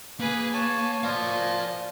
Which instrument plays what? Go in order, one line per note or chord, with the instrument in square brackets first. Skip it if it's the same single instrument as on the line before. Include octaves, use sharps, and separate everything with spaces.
[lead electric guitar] A#3 [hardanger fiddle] G#4 B4
[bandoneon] C#5 A5 [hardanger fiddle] G#5
[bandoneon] F3 F4 [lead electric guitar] D5 F5